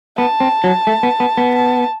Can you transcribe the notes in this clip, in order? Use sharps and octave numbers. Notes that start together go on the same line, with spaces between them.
B3 A5
C4
F#3
A3
B3
B3
B3
A5